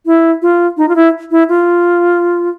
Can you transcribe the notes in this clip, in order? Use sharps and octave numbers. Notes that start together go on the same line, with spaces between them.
E4
F4
D#4
F4
E4
E4
F4